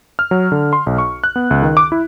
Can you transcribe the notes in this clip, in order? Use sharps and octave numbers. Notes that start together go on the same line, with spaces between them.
F6
F#3
D3
C6
B1
C#6
F#6
B3
C#2
D#3
D6
E4